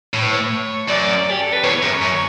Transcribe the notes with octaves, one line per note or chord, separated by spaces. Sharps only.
A2 C#5
B4
C#5
F#2 D5
G4
A4
B4
E2 C#5
F#2
F#2